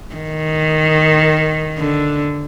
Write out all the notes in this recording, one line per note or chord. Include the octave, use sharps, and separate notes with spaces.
D#3
D3